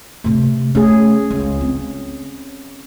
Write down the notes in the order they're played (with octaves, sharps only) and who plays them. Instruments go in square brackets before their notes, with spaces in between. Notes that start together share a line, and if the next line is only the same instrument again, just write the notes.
[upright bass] C3 A3
[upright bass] A3 [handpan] C#4 G#4
[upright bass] C#2
C4